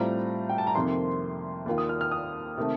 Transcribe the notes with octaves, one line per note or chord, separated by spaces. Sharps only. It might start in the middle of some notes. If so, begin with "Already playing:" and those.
Already playing: A2 G3 C4 F4 A#5
G5
A5
A#5
F2 C3 D#3 A#3 C6
D#2 D#3 A#3 F4
D#6
F6
F6
D#6
C3 D#3 A3